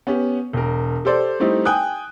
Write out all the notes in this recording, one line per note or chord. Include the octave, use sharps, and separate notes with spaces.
B3 C#4 G4
E1 A#4
G4 A4 C5 D5
G3 A3 C4 D#4 E4 G4
G5 G#5 D#6 F#6